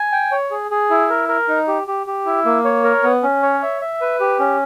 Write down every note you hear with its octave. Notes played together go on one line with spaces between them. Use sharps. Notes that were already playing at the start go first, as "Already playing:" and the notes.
Already playing: G#5
G5
C#5
G#4
G#4
E4
A#4
A#4
D#4
G4
G4
G4
E4
A#3
C#5
A#4
B3
C#4
C#5
E5
E5
B4
G4
C#4